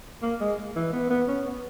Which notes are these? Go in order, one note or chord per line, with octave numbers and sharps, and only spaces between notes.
A#3
G#3
E3
B3
B3
C#4
B3